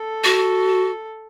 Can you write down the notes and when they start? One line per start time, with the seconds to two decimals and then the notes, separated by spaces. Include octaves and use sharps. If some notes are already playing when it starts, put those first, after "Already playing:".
Already playing: A4
0.24 F#4